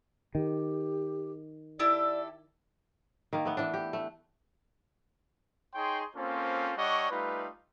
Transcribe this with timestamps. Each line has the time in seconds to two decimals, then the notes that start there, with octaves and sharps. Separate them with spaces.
0.35 D#3 G4
1.79 E4 G4 A4 D5
3.33 D#3 A#3
3.45 A3 B3
3.57 E3 D4
3.74 G4
3.93 A3
5.75 D#4 G#4 C#5 G5 C6
6.16 A#3 C4 C#4 F4 A4 C5
6.77 G3 D4 C#5 D#5 F#5 C#6
7.11 G3 A3 D#4 F4 B4